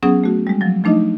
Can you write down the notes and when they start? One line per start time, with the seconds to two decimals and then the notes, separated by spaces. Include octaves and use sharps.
0.03 F#3 B3 C#4 G#4 F#5 D#6
0.24 A3 F#4
0.47 G3 G#3
0.61 F3 F#3
0.84 F3 A3 D4 D#4 D#5